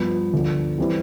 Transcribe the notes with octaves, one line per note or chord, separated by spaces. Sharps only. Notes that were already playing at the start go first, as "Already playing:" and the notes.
Already playing: G2 F3 B3 F4
D2 D3 F3 B3
E3 G3 C4 E4 B4